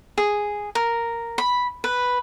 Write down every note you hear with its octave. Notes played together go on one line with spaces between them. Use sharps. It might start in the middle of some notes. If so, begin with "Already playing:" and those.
G#4
A#4
B5
B4